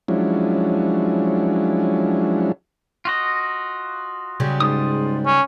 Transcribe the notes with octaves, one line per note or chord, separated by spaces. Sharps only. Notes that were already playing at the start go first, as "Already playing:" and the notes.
F3 F#3 G#3 C#4 D4 E4
F4 F#4 D#5
C#3 F#3 G3
G#2 F4 D#6
C#4